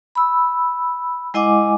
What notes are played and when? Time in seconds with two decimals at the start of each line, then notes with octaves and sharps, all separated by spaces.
0.15 B5 E6
1.34 G#3 E4 D#5 F#5 G#5 D6